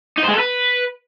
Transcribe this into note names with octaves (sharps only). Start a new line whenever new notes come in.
D#4
C5
G#3
A4
B4